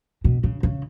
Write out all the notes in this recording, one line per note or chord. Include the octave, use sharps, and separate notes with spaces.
B2
C#3
C#3